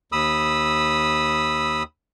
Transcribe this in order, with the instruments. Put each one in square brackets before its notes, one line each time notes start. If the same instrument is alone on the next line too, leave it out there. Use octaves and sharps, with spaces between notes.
[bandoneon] D#2 B5 D#6 E6